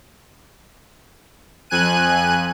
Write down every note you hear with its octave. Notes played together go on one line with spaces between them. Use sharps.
F2 G#5 F#6 D#7